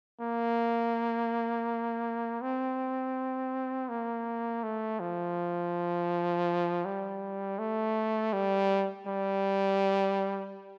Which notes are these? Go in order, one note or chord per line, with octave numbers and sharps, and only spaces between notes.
A#3
C4
A#3
A3
F3
G3
A3
G3
G3